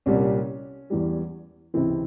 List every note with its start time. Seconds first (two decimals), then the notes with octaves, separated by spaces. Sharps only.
0.06 C2 A#2 G3 C#4
0.90 E2 E3 G3
1.74 C#2 C3 E3 C4 E4